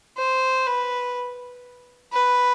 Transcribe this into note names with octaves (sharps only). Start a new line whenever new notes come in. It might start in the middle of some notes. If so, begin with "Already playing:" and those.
C5
B4
B4